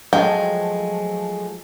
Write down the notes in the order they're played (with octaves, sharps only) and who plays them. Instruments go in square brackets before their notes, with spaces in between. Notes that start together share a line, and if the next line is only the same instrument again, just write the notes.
[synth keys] F3 F#3 A3 [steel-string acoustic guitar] G#3 [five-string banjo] G5